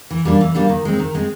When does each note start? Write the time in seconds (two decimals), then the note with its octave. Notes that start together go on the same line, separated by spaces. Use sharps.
0.11 E3
0.25 G3 A#3 D4
0.41 E3
0.55 G3 A#3 D4
0.69 D#3
0.85 G#3 C4
0.99 D#3
1.15 G#3 C4